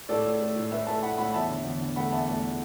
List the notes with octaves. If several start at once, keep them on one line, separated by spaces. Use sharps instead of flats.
A2 A4 D5
A3
A3
A2
A2 B4 E5
A3 E5 A5
A2 F#5 B5
A2 F#5 B5
E2 E5 A5
D3
E2
D3
A3 F#5 B5
E2 E5 A5
A3 E5 A5